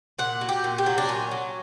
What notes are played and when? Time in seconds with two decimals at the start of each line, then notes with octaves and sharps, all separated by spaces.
0.19 A#2 F#5
0.41 F#3
0.49 G4
0.64 A#2
0.78 G4
0.86 F#3
0.98 D4
1.08 A#2 C#4
1.31 F#3